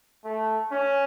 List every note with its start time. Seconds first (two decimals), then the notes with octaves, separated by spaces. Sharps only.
0.25 A3
0.71 C#4